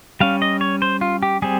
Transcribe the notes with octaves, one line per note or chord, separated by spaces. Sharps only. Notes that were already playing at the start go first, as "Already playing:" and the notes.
G3 C#4 F5
D#5
C#5
C5
F4
G4
G3 C4 G#4